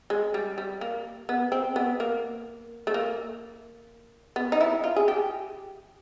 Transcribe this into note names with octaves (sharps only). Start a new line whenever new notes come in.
G#3
G3
G3
A#3
B3
C4
B3
A#3
A3
A#3
B3
D#4
E4
F4
G#4
G4